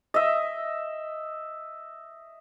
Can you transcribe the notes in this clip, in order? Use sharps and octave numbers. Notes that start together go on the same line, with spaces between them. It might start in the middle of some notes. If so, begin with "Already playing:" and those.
D#5 E5